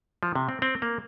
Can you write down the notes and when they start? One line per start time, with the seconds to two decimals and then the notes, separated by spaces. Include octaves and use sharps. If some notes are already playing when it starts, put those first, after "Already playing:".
0.23 F3
0.35 C3
0.49 C4
0.62 C4
0.82 A#3